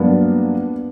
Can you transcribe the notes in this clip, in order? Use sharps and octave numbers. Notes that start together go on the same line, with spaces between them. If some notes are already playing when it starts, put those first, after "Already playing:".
Already playing: G2 F#3 A#3 B3 D4